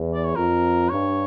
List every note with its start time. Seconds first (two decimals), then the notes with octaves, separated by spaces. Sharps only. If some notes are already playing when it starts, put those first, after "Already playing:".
Already playing: E2
0.14 D5
0.24 C#5
0.35 F2 A#4
0.89 G2 C#5